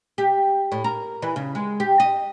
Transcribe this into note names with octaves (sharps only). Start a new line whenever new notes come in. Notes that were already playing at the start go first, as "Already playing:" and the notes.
G4
A2
A#4
E3
C#3
G#3
G4
D#5